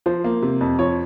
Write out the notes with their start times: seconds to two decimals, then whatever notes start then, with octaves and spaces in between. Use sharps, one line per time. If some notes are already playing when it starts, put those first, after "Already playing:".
0.06 F3 C5
0.24 A#3
0.42 C3
0.61 F2
0.79 F3 C#5